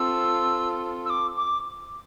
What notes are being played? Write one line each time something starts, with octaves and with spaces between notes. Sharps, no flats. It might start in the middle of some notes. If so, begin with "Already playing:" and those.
Already playing: C4 F4 A4 E6
E6
D6
D6